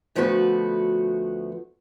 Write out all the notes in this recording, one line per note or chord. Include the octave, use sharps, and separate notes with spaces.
D2 F3 A3 B3 F#4 B4